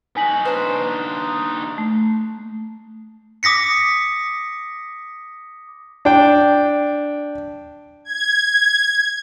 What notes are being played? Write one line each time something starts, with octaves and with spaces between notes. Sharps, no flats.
D#4 F#4 G#5 B6 F#7
D4 B4 C5
A3
D6 D#6 A#6 B6 C#7
D4 G5
G#6